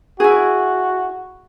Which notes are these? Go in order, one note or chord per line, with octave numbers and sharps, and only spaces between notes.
E4 F#4 G#4